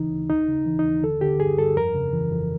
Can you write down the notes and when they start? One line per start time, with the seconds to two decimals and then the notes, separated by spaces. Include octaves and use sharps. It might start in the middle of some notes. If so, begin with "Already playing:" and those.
Already playing: D2 C#3 E3 D#4
0.11 D2
0.30 D#2 D#4
0.48 C#3
0.66 E3
0.79 D#4
0.84 D#2
1.03 D3 A4
1.21 D3 G4
1.40 G2 G#4
1.58 G2 A4
1.77 F2 A#4
1.95 C#3
2.13 E3
2.31 F2